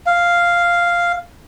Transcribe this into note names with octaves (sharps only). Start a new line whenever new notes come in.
F5